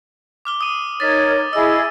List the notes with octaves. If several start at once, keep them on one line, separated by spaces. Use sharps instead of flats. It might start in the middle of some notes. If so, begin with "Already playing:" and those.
D6 F6 G7
D#6 D#7
D#4 A#4 C#5 A6 B6
E4 G#4 D#5 E6